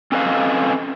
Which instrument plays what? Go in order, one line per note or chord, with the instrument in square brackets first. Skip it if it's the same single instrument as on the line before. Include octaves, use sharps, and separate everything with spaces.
[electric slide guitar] C4 C#4 A4 B4 D#5 F5